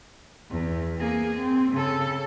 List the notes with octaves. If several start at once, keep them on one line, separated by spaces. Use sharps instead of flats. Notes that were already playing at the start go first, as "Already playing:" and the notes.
E2
A#3 G#4
C4
C#3 A4